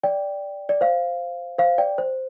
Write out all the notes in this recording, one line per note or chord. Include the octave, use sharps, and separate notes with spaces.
D5 G5
D5
C5 F5
C5 F5
D5 G5
C5